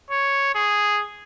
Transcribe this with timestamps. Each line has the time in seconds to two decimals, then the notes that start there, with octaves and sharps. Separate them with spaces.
0.10 C#5
0.55 G#4